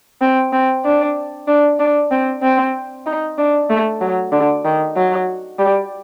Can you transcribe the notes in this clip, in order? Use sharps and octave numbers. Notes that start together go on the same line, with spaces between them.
C4
C4
D4
D4
D4
C4
C4
D#4
D4
A3
F#3
D3
D#3
F#3
G3